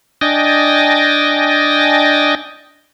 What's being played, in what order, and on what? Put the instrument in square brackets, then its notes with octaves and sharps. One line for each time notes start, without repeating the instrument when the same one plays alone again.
[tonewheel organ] D4 D#5 G5 G#5 A6 A#6